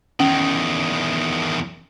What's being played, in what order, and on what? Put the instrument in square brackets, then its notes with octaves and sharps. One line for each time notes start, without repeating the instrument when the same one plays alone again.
[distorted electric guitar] E2 D#3 [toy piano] C#4